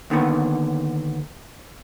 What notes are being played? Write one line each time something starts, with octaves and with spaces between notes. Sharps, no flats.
D#2 D3 D#3 B3